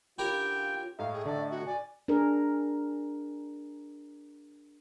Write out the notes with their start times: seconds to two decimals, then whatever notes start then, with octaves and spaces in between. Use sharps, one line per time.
0.18 D3 C#4 E4 F4 G4 A#4 G5
0.99 A2 A3 D#4 E5 F5
1.14 G#4
1.26 D3 A4 D5
1.51 F#4
1.66 D5 G#5
2.08 D4 G#4 A#4